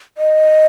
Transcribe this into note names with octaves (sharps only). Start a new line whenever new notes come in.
D#5